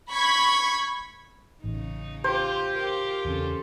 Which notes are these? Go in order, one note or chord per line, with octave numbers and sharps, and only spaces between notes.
B5 C#6 G#6 B6
A1 C#3 D#4
F4 G4 C5
F4 G4 A#4
E2 C#3 C4 C#4 A4